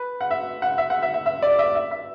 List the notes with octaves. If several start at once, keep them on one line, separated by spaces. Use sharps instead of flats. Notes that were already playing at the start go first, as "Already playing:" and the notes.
Already playing: B4
F#5
E5
F#5
E5
F#5
E5
E5
E5
D5
E5
E5
E5